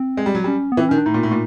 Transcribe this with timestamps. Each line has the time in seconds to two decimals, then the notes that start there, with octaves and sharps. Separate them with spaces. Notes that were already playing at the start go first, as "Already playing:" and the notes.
Already playing: C4
0.17 G#3
0.26 G3
0.35 F#3
0.44 G3 C#4
0.72 B3
0.77 E3
0.81 C4
0.89 D#3 C#4
0.98 D4
1.06 A2 D#4
1.14 A#2
1.23 A2
1.31 A#2